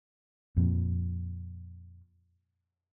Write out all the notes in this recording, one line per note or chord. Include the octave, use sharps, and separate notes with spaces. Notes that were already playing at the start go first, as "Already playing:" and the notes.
F2 A#2